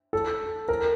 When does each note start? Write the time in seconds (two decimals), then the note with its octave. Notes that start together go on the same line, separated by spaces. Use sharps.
0.13 A4
0.68 A#4